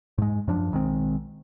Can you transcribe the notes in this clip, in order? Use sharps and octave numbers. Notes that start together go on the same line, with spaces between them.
G#2 G#3
F#2 F3 D4
B1 D#3 G#3 C4